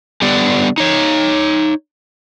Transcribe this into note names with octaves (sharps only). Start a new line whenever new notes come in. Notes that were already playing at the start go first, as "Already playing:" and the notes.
D3 G3 B3 D5
D#4 C#5